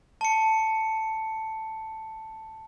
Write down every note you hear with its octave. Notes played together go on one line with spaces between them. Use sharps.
A5 C#7